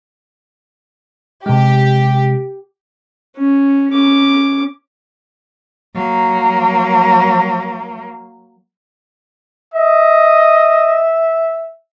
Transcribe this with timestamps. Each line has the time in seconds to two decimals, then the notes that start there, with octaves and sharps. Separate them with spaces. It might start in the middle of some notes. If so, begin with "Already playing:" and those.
1.46 C3 G#3 G4
3.37 C#4
3.92 C#4 D6
5.95 F#3 A#3
9.74 D#5 E5